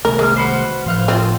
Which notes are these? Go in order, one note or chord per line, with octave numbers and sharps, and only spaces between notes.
C3 D#3 A3 A#4
G#3 D6 D#6 F6
F#4 B4 C5
A2 F3 C5 F5 F#6
C4 F4 D#6